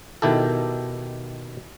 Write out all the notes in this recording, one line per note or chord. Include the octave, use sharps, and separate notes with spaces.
B2 D#3 E4 G4 A4